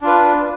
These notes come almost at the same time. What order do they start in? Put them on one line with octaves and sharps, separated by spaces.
D4 F4 B4